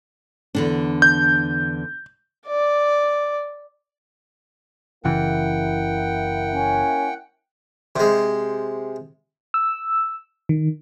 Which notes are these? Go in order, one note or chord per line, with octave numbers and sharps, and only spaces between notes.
E2 D3 D4
G6
D5
F#1 C#3 E3 A#3 E4 F#5 G5
C#4
C3 G#3
E6
D#3